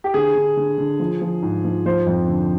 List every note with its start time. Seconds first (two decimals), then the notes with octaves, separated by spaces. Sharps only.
0.04 G4
0.14 D3 G#4
0.35 D3
0.57 D3
0.78 D3
1.00 F3
1.21 F3
1.42 G#2
1.64 F3
1.86 F3 C5
2.07 F2
2.28 D3